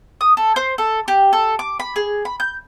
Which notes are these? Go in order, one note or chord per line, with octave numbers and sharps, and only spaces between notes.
D#6
A4
C5
A4
G4
A4
D6
B5
G#4
B5
G6